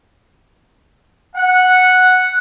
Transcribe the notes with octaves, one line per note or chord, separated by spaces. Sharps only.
F#5